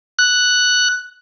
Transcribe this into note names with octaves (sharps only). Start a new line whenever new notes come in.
F#6